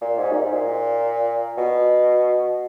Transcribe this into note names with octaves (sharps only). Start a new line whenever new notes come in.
A#2
G#2
F#2
G#2
A#2
B2